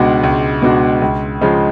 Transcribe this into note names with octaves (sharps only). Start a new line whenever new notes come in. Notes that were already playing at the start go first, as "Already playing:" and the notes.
Already playing: C#2 B2 G#3 D4 F#4
C#2
B2 G#3 D4 F#4
C#2
C#3 F3 G#3